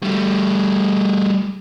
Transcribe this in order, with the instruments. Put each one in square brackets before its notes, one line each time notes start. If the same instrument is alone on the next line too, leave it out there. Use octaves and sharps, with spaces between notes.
[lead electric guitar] G3 A3